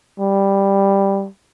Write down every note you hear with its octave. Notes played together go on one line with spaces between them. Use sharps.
G3